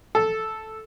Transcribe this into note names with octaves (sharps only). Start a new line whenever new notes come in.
A4